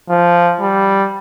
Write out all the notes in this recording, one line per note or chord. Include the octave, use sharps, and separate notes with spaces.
F3
G3